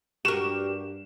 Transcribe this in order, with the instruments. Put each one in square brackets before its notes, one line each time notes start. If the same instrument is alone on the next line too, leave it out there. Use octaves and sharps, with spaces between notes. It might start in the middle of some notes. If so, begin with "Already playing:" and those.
[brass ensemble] G2 [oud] F#4 A#4 [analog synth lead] G4 [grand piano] E7